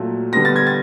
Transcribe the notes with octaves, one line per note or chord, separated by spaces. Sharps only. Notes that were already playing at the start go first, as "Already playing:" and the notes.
Already playing: A#2 F#3 A3
D3 G3 B3 A#6
A6
G#6
A6